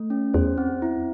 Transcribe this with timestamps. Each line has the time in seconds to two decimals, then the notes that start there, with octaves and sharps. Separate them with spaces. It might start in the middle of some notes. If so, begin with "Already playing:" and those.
Already playing: A3
0.10 C#4
0.34 E2 C5
0.58 C4
0.82 E4